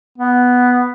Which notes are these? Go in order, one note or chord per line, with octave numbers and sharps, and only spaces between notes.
B3